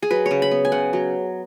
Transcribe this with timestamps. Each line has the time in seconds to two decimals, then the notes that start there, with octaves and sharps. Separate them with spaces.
0.02 G#4
0.11 F#3 B4
0.26 C#5
0.31 C#3
0.42 B5
0.51 B3
0.65 G#5
0.72 C#3 F#5
0.93 F#3